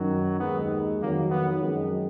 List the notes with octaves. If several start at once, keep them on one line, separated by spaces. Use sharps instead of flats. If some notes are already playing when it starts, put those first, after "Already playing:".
Already playing: F#2 D#3 F#3
D#2 D#3 G#3 B3
F2 D#3 F#3 A#3
B3
F#2 D#3 G#3